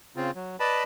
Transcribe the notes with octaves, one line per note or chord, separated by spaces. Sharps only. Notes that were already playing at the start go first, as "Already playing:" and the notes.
C#3 C4 F4
F#3
B4 D5 D#5 A5 B5